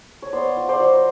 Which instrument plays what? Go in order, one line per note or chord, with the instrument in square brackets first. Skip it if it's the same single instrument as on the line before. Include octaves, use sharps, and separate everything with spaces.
[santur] C#5
B3 C5 D5
F4
C5 D5
F#3